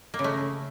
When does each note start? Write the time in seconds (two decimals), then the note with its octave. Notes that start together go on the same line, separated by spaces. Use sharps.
0.14 A#3
0.19 C#3
0.24 A3